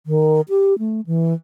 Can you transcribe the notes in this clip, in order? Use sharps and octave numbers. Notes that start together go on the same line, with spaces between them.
D#3
G4
A3
E3